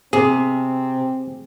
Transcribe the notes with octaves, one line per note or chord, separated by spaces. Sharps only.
C3 C4 G#4